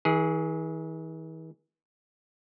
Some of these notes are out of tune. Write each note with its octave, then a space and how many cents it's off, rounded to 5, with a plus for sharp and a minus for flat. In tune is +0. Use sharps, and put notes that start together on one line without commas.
E3 -45 G#4 +0